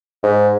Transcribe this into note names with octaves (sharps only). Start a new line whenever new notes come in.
G#2